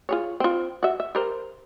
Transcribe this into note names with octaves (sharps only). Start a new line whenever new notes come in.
F4 G#4 C#5
C4 F4
F#4 E5
E5
G4 A#4 C5